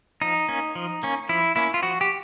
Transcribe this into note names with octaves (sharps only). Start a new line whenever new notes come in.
F3 D#4
A#3 C#4
F3
A#3 C#4
F3 E4
A#3 C#4 E4
F4
F3 F#4
G4